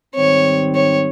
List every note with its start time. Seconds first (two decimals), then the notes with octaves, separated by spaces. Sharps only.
0.15 G#2 D#3 G3 C4 C#5
0.75 C#5